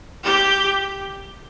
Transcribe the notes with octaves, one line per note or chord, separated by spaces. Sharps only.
G4